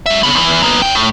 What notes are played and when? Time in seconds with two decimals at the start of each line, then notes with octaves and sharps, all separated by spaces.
0.06 F#3 E5
0.23 C#3 B3
0.35 E2 E3
0.62 A#3 B3
0.82 B2 G5
0.95 A2